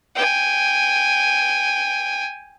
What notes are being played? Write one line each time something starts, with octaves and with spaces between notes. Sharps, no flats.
G5 G#5